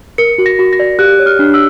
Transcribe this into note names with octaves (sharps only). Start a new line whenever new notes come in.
A#4 C#7
F#4
A#6
F#4
A#6
D5
G4 F#6
C#5
F6
D4
E6